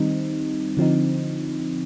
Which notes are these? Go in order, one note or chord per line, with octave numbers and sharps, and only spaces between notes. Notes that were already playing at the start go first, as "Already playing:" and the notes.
Already playing: D#3 G3 C4 D#4
D3 F3 C4 D#4